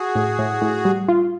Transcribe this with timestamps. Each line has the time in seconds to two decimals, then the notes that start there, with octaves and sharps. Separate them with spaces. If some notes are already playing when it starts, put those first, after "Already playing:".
Already playing: F#4 G#4
0.15 A2
0.39 A2
0.62 A2
0.85 G3
1.09 F4